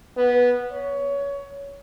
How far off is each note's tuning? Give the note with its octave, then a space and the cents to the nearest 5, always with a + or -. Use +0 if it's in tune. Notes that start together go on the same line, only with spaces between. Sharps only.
B3 -10
C#5 +20